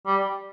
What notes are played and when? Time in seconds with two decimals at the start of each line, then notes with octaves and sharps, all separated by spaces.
0.06 G3